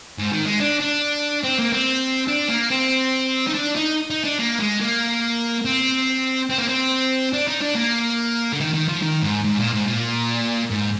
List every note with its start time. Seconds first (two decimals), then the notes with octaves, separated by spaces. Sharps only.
0.18 G#2
0.31 D#3
0.45 G#3
0.60 D4
0.81 D4
1.44 C4
1.59 A#3
1.72 C4
2.28 D4
2.49 A#3
2.70 C4
3.47 D#4
3.54 D4
3.76 D#4
4.10 D#4
4.24 D4
4.39 A#3
4.60 G#3
4.81 A#3
5.65 C4
6.50 C4
6.58 A#3
6.67 C4
7.33 D4
7.48 D#4
7.61 D4
7.75 A#3
8.53 D3
8.60 D#3
8.74 D#3
8.88 F3
9.02 D#3
9.23 G#2
9.44 G#2
9.59 A#2
9.72 G#2
9.86 A#2
10.70 G#2